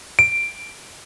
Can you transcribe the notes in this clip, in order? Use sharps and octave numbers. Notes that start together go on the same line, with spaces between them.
D7